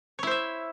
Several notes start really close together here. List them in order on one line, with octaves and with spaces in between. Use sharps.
C#5 E4 C5 E5